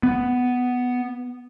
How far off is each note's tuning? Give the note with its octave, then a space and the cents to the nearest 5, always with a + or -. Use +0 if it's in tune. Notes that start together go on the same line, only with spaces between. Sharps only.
B3 +5